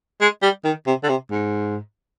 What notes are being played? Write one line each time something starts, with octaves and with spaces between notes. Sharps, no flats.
G#3
G3
D#3
C3
D3
C3
G#2